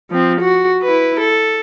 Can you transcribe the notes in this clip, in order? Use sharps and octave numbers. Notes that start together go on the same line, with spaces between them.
F3 C4
F#4
E4 B4
A4